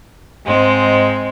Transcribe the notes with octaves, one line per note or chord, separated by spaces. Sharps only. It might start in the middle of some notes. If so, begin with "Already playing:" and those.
G#2 G#3 C4